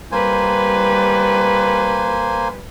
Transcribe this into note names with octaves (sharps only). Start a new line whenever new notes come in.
G3 A#3 B4 C5 G#5